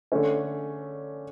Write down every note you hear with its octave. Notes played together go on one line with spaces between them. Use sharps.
D3 A3 C#4